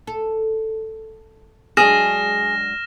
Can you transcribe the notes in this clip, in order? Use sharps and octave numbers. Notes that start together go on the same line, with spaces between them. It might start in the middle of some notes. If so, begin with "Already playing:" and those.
A4
F#3 G#3 D4 G#4 F6 A#6 E7